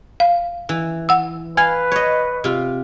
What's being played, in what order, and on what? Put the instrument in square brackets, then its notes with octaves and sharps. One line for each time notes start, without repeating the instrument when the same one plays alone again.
[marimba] F5
[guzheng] E3
[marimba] F#5 E6
[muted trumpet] B4 [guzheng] F5 [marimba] G#5 G#6
[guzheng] C#5 D#5
C3 F4